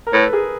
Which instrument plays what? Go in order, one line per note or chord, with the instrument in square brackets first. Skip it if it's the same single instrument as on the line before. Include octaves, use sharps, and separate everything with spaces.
[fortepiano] A#4
[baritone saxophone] A2 [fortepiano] A4 B4
[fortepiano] G#4 A#4